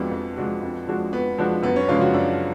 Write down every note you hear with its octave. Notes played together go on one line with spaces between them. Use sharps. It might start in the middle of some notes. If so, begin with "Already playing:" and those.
Already playing: F2 F3 G#3 B3 D4 F#4
F2
F3 G#3 D4 F#4
F2
F3 G#3 D4 F#4
F2 B3
F3 G#3 D4 F#4
F#2 B3
C#4
C#3 F3 G#3 D4 F4
F#4
F#2 D4